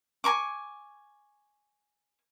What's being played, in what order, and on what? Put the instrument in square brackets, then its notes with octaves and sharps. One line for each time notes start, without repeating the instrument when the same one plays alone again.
[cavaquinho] G#5 A#5 C#6 D6